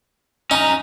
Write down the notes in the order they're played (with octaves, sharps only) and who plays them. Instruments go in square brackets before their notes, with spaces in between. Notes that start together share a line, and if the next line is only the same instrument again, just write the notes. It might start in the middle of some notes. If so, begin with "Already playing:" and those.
[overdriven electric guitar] C#4 A#5 [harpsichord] D#4